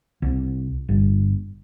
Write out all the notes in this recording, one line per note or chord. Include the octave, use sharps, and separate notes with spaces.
C2
G1